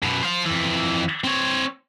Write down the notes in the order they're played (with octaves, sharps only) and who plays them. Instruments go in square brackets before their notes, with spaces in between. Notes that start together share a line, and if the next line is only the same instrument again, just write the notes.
[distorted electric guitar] F#2 B2
C5 F5
F2 E3
C4 C#5